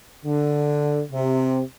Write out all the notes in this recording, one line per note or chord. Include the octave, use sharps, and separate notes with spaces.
D3
C3